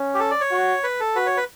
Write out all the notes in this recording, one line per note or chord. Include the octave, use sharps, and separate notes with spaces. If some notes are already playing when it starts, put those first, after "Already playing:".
Already playing: C#4
G4
A4
D5
C#5
F#4
B4
A4
F#4 B4
C#5
B4